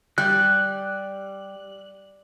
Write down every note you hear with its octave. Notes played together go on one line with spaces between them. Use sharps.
G3 F#6